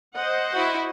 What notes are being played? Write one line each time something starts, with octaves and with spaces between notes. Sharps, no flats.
C5 D#5 F#5
E4 F#4